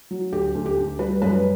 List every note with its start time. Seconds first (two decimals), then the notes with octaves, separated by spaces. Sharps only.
0.11 F#3
0.32 D2 G4
0.55 D2
0.66 G4
0.78 D2
0.99 G3 B4
1.22 F#2 B4